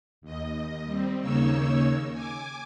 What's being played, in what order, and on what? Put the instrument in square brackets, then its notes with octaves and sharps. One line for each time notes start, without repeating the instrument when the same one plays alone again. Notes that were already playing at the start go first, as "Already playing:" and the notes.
[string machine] D#2 D#5
G3 C4
D#2 C#3 A#3 D#4 C#5 E6
G#5 D6